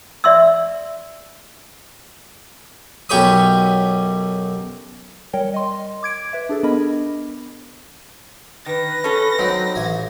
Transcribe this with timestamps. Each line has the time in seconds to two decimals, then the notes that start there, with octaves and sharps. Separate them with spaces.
0.24 D5 E5 C6 E6
3.09 B1 F#2 G4 C#5 B5 D#6
5.33 G3 A#4 C#5 G5
5.54 D#5 C6
6.03 D6 G#6 D7
6.33 B4 E5
6.49 D4 G#4 A4
6.63 B3 D4 A#4 D#5 B5
8.66 D#3 B4 A#6
9.04 C#4 A4
9.39 F#3 C4 D#4
9.75 A1 E5 G#5